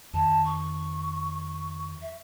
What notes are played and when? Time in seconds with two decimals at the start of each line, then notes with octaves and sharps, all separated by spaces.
0.13 F2 D#3 A5
0.44 C#6
2.01 E5